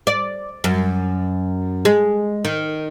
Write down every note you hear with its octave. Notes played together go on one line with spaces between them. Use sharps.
D5
F#2
G#3
D#3